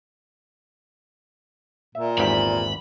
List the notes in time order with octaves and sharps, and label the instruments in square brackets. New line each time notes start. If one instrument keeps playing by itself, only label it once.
[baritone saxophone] A#2 [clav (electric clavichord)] E5
[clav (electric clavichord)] G#1 E2 G4 [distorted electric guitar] B5